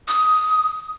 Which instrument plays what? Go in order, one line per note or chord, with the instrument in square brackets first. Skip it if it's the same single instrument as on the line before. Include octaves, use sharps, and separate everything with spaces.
[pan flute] D#6